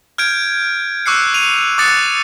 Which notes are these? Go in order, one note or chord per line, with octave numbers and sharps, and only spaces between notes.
F6 G6 G#6 D7
C#6 D6 E6 F#6 C7 C#7
D#7 F7
D6 D#6 F#6 A6 C#7